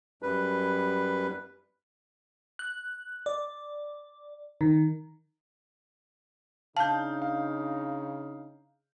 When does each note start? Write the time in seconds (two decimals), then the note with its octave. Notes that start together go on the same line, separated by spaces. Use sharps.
0.22 F#2 G3 B4
2.59 F#6
3.26 D5
4.61 D#3
6.77 C#3 D4 D#4 F5 A5 G6
7.22 F5